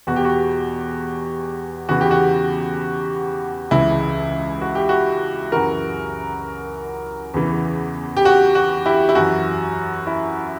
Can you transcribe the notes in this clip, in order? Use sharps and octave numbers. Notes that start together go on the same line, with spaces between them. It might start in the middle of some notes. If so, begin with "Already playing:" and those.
E2 B2 F#4
G4
F#4
E2 C#3 E3 F#4
G4
F#4
C#2 C#3 E3 E4
F#4
G4
F#4
F#2 C#3 E3 F#4 A#4
E2 C#3 E3
G4
F#4
F#4
E4 G4
E4
F#2 E3 F#4
E4